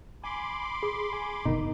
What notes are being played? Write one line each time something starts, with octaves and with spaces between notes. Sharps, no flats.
G#5 B5 C6 D6
G#4
G#5
F#1 B2 D#3 D#4